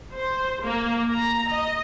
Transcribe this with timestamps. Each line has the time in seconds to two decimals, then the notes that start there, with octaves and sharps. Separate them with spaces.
0.13 C5
0.61 A#3
1.11 A#5
1.49 D#5